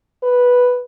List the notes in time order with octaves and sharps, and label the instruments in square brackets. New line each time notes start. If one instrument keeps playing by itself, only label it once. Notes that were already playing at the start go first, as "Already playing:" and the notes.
[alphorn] B4